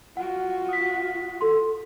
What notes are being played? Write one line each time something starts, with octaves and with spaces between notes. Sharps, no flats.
F4 F#4 F#5
D#6 B6
A4 C6